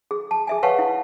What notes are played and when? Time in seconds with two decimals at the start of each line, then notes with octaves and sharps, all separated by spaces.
0.11 G#4
0.31 A5
0.47 G#4 E5 G#5
0.63 B4 C#5 F5 F#5 A5 C#6
0.79 E4